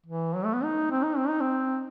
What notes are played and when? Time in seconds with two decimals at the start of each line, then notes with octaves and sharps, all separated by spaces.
0.06 E3
0.35 F#3
0.45 A3
0.54 B3
0.64 D#4
0.91 C4
1.03 D#4
1.17 C4
1.28 D#4
1.41 C4